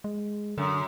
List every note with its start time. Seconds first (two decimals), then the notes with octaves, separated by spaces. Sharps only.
0.04 G#3
0.58 F#2 D3